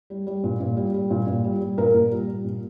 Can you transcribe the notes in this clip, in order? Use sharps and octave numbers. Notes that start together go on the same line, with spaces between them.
G3
G3
A#2
A#2
G3
G3
A#2
A#2
G3
G3
A#2 A#4
A#2
G3
G3
A#2